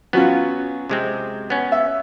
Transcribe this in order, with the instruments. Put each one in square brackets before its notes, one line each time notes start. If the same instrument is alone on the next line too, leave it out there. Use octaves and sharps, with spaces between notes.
[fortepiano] F#3 C#4 F4 [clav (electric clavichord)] B3
[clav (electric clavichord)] C3 G#3 C4
B3 C#4
[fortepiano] E5